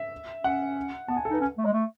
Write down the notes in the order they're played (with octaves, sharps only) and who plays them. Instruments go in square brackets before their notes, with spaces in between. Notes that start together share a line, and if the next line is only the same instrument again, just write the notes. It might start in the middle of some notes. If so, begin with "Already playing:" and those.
Already playing: [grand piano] E5
[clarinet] C#4 [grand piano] F#5
[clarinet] B3 [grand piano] A5
[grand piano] G#5
A4
[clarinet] D#4
[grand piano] B4
[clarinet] C#4
A3
G#3
A3